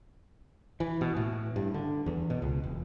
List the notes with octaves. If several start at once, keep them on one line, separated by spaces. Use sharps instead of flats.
E3
B2
A2
G2
D3
E2
B2
C#2
E1